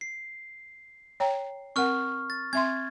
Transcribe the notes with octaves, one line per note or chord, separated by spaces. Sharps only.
C7
C#5 G5 A#5
C4 A#4 F#5 C#6 F6
A6
C4 E5 C6 G#6